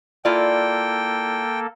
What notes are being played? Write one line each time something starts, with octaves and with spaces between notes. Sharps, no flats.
A#3 E4 F4 A4 D5 G5